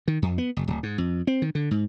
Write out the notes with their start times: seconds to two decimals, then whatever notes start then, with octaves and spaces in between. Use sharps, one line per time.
0.08 D#3
0.22 F2
0.38 B3
0.57 F#1
0.68 D1
0.83 G#2
0.98 F2
1.27 C4
1.42 D#3
1.55 D3
1.71 G#2